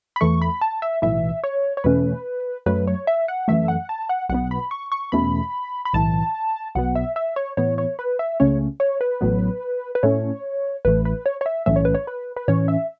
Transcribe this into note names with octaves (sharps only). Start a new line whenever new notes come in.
B5
E2 E3 A3 C#6
B5
A5
E5
B1 A2 E3 E5
C#5
C#5
E2 B2 A3 C#4 B4
F#2 F#3 A3 B4
C#5
E5
F#5
F#2 E3 A3 E5
F#5
A5
F#5
B1 B2 B3 F#5
B5
C#6
C#6
E2 B2 A3 C#4 B5
B5
B1 A2 E3 A5
B1 B2 F#3 B3 F#5
E5
E5
C#5
A2 E3 B3 C#5
C#5
B4
E5
C#2 C#3 A3 C#4 C#5
C#5
B4
A1 A2 F#3 B3
B4
A2 A3 C#4 C#5
A1 A2 E3 A3 B4
B4
C#5
C#5
E5
B1 A2 E3 A3 C#4 E5
C#5
B4
C#5
B4
B4
A2 E3 C#4 C#5
E5